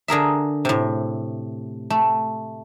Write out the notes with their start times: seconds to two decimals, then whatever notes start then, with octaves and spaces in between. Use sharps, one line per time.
0.08 D3 G#4 A#4 E5
0.65 A2 C3
1.90 A3